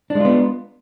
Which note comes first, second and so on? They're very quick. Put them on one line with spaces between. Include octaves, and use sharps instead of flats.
D4 G#3 F4 B3